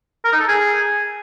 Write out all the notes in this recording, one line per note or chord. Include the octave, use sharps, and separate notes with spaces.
A#4
D#4
A4
G#4